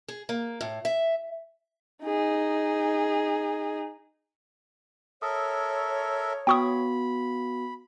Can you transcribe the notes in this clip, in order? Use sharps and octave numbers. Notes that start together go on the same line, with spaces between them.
G#4
A#3
A2
E5
D#4 G#4
A4 A#4 C#5 E5 D#6
B3 F#4 G5 B5 C#6 D#6